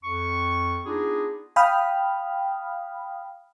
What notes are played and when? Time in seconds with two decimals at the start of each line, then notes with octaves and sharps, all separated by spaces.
0.03 F2 C#6
0.85 B3 D4 D#4 F4 G#4
1.56 F5 G5 B5 D#6 F6